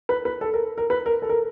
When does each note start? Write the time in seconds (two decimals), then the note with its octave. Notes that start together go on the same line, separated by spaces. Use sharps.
0.09 B4
0.25 B4
0.41 A4
0.54 A#4
0.78 A#4
0.90 B4
1.06 A#4
1.22 A4
1.29 A#4